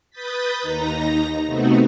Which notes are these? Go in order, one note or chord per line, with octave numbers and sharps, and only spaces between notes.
B4 D#6 G6 A6 B6
D#2 D#4 A#5 A#6
C3 A3 B3 C4 D#4 F#4